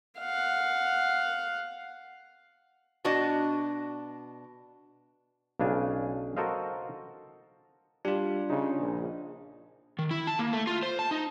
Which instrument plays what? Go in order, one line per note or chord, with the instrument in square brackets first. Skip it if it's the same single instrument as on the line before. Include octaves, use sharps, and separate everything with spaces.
[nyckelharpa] F5 F#5
[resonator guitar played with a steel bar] B2 D4 F#4 D5 D#5
[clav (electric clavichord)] B1 C#3 D4 F5 G#5
F#4 A4 A#4 C5 D#5 F5
[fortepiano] G3 [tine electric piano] D4 F4
[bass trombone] C#3 [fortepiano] D#4
[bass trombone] A#1
[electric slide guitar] D#3
E4
A5
A#3
A3
F4
C5
A5
D#4